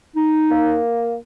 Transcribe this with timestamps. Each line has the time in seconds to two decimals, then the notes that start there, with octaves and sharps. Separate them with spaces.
0.16 D#4
0.50 A#3